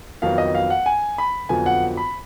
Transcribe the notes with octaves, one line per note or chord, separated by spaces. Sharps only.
F2 D#3 F#3 B3 F5
D#5
F5
F#5
G#5
B5
F2 D3 F#3 B3 F4 G#5
F#5
B5